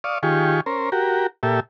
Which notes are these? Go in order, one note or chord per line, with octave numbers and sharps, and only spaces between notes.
D5 F5 C#6 D#6
D#3 F4 G4 G#4 C#6
C#4 A#4 C5
F#4 G4 A#4
A#2 G4 A4 E5